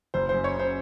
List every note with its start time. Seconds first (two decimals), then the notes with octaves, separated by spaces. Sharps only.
0.14 F#1 C5
0.29 C5
0.34 F#2
0.44 C#5
0.54 C#3
0.59 C5